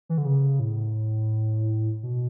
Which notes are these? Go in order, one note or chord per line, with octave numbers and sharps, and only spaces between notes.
E3
D3
C#3
A2
B2